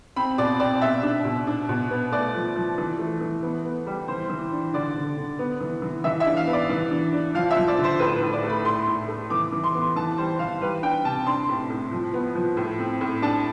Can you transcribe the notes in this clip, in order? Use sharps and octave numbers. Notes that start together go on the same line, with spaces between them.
C4 B5
B2 D5
C4 D5
B2 E5
D4
B2
D4
B2
B3
A3 D5
F3
F3
E3
A3
E3
B3
B3
G3
E3 C5
E3
D4
D3 D5
D3
D3
B3
E3
E3
E3 E5
E5
D4
F5
B3
D5
E3
D4
D4
F3 F5
E5
F3
D5
D3
C5
A2 B4
B4
A2
D5
A3
B5
A2 C6
A2
A3
E3 D6
E3
C6
B3
E3 A5
G3 C5
E3 F5
G3 B4
D4 G5
C3 A5
D4 C6
A2
A2
F3
B3
F3
A2
C4
A2
D4 A5